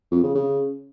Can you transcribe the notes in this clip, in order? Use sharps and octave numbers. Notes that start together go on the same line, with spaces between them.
F2
C#3
C#3